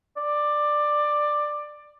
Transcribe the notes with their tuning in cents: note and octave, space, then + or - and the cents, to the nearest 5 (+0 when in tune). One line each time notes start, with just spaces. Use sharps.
D5 +10